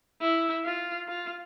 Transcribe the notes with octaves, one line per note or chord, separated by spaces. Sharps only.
E4
F4
F4